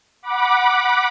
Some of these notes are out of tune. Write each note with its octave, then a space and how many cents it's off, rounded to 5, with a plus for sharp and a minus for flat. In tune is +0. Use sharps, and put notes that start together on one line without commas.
F#5 +0 B5 -25 D6 +10